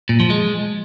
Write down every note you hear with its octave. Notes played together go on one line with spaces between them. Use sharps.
A#2
F3
G#3